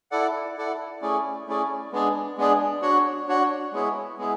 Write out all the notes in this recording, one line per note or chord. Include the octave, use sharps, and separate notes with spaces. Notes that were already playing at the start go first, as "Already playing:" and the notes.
E4 A4 D5 F#5
E4 A4 D5 F#5
A3 C#4 E4 G#4 D5
A3 C#4 E4 G#4 D5
G#3 B3 D4 G#4 D5
G#3 B3 D4 G#4 D5
D4 F#4 C#5 F#5
D4 F#4 C#5 F#5
G#3 B3 E4 G#4 C#5
G#3 B3 E4 G#4